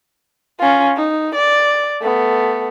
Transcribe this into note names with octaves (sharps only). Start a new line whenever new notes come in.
C#4 F4
D#4
D5
A3 B3